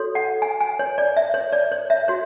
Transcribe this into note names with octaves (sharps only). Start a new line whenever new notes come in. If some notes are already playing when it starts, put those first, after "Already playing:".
Already playing: F#4 A4 C#5
F#5
G#5
G#5
C#5
D5
E5
C#5
D5
C#5
E5
F#4 C#5